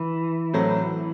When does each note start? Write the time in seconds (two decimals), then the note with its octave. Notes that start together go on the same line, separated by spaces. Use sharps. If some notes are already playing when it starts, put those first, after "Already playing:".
Already playing: E3
0.53 A2 F#3 A3 C4